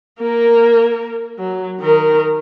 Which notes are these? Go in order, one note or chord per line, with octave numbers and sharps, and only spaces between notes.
A#3 A#4
F#3
D#3 A#4